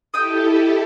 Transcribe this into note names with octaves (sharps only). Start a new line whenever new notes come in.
E4 G4 A4 D#5 G5